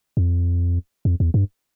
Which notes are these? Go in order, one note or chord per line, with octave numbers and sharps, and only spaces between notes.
F2
F2
E2
G2